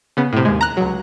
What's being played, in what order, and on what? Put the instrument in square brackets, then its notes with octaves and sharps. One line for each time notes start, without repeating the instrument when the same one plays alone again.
[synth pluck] C#3 B3
A2 C3
D#2 G#3
A#5 F#6
C#2 F#3